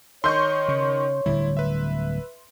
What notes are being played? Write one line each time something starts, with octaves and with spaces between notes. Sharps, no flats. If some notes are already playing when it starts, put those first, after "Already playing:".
D#3 C#5 D#5 C6 C#6 G6
C#3
D1 D3 G3 E4
B4 E5